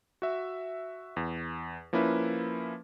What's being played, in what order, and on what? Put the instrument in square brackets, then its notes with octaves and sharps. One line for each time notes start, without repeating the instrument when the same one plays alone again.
[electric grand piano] F#4 E5
E2
F3 A#3 C#4 E4 B4